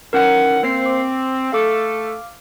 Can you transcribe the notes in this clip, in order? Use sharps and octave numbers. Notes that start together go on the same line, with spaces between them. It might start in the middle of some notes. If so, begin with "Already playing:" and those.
D#3 E3 C#4 A#4 F#5
A#3 C4 C5 C7
D6
A3 A4 F5 D6 F6